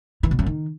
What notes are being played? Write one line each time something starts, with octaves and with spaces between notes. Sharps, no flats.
E3
B2
F#2
D#3